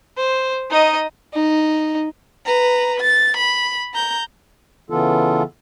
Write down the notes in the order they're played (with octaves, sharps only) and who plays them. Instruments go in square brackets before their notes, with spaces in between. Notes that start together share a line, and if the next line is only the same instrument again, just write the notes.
[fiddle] C5
D#4 D#5
D#4
[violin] B4 A#5
A6
B5
A#5 G6
[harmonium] C#3 E3 B3 F4 A4